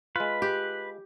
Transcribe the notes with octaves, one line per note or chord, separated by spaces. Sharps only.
G#3 F4 B4
G4